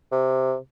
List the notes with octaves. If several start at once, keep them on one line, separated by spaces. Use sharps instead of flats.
C3